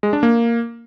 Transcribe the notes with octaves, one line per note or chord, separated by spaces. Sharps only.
G#3
D4
A#3